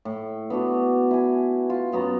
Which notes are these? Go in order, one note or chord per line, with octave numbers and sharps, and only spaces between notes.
A2
B3 D4 F#4
E4 G#5
F4
F#2 B3 F#4 A#5